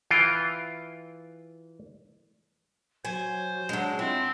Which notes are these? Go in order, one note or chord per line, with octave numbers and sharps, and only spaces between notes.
E3 F4 G5
F#3 C5 G#5
F#3 G#3 D4
C4 E4 F4